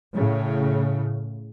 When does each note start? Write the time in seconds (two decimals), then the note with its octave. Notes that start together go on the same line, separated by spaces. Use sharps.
0.14 A2 C#3